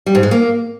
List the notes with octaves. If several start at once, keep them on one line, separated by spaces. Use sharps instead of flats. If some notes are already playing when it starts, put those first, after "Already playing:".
G3
G#2
G#3
A#3